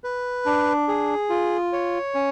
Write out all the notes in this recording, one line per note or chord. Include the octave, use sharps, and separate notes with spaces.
B4
D4
G#4
F4
C#5
C#4